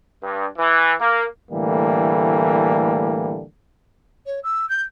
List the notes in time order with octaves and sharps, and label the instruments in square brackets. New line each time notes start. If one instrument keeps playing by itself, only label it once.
[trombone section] G2
E3
A#3
A2 D3 E3 G3 A3 A#3
[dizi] C#5
E6
G6